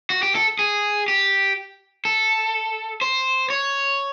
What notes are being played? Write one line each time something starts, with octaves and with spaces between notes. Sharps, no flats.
F#4
G4
A4
G#4
G4
A4
C5
C#5